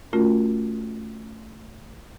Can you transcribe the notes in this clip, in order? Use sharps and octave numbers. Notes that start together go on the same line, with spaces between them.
A3 C#4 F4 F#4 A#4